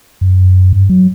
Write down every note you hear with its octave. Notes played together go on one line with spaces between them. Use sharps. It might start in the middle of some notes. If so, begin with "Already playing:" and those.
F#2
G2
F#3